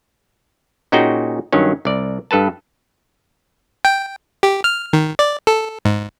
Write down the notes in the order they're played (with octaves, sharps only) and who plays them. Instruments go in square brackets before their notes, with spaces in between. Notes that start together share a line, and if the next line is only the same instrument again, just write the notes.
[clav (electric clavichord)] A#2 C#4 D#4 F#4 G#4 G5
G2 D#3 F#3 C#4
C2 D5
G2 A4 B4 A5
[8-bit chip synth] G5
G4
F6
D#3
D5
A4
G#2